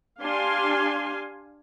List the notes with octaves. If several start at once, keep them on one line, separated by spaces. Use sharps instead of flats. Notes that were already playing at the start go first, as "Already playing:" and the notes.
D4 G4 F5 G#5 C6